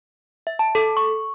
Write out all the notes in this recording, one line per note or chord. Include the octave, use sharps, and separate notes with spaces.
E5
A5
A4
C#6